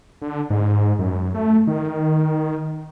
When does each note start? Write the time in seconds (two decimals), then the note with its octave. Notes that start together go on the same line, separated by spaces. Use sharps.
0.22 D3
0.50 G#2
0.99 F#2
1.34 A3
1.67 D#3